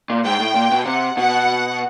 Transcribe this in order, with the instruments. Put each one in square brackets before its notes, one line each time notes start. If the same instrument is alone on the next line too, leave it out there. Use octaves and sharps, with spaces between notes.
[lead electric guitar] A#2
[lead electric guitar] G#2 [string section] G5
[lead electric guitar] A2
A#2
B2
[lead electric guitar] C3 [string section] F#5
[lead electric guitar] B2 [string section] F#5